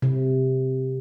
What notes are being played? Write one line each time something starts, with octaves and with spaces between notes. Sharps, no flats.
C3